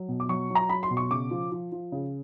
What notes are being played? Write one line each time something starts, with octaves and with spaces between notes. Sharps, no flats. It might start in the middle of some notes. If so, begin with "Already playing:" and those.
Already playing: F#3
B2
D6
F#3 C#6
F#3
A#5
F#3 B5
C6
B2
C#6
C#3 D6
F3
F3
F3
C#3